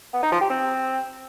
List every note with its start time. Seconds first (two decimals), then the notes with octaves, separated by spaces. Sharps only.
0.14 B3
0.23 D#4
0.32 F3
0.41 G4
0.50 C4